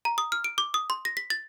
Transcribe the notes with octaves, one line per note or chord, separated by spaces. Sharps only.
A#5
D#6
F6
D7
D6
D#6
C6
A#6
B6
A6